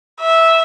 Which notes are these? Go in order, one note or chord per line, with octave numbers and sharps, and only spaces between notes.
E5